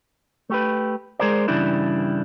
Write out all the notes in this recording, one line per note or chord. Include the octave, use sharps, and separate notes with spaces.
A3 G4 B4
G#3 G#4 A#4 C5 D5
G2 C#3 E3 G3 D4 E4